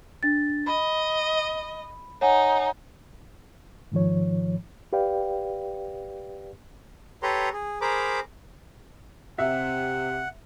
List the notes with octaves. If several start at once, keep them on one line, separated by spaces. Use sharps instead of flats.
D4 A6
D#5 B5
D#4 C#5 F#5 G#5
G#2 D#3 F3 C#5
G4 B4 D5 F5 G5
G4 A4 B4 C#5 A#5 C6
G#4
G#4 A#4 C5 A#5 B5 D6
C3 E5 F#5